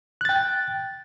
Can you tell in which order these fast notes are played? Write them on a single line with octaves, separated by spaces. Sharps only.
F#6 A6 G5